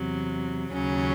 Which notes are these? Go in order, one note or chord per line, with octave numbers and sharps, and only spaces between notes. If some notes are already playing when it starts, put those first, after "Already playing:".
Already playing: E2 C3 F#3
D#2 C#3 F#3 C#4